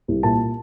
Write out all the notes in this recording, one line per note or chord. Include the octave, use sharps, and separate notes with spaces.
C2
A#2 A5